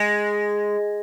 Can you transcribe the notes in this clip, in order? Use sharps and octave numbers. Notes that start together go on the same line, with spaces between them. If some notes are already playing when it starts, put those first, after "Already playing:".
Already playing: G#3